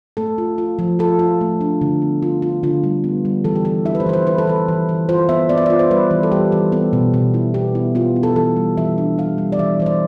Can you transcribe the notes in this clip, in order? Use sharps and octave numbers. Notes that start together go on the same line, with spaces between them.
A3 A4
F4
F4
F3
F4 A4
F4
A3
D4
D3
B3
F4
F4
D3 F4
G3
B3
G3
E3 A4
G4
E3 A4
E4 E5
B4
C5
E3 B4
C5
E4 B4
A4
E3 B4
E3
E3
F4 C5
B3 E5
B3 D5
E5
F4 D5
C5
G3 B4
E3
A4
G3 G4
E3 A4
B3 A4
B2
B2
E4
B3 G4
E4
B3 F4
E4
A4
E3 A4
G3
E3 E5
D4
G3 F5
G3
D5
E3 E5
E3 C5
D5